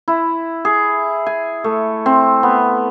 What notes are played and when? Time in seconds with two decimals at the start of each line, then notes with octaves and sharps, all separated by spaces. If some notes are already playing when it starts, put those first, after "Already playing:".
0.08 E4
0.65 G#4
1.27 G#5
1.64 A3
2.06 C4
2.43 B3